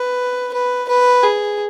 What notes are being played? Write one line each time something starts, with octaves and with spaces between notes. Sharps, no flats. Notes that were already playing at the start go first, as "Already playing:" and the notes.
Already playing: B4
B4
B4
G#4